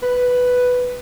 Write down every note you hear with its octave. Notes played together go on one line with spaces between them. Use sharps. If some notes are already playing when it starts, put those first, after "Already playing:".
B4